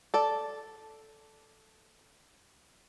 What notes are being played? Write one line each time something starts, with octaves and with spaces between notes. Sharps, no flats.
A4 D5